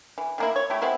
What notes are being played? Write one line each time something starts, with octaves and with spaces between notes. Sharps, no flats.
E3
D#3 A#3 E4
C#5
A3 E4 G4
G#3 B3 C4 E4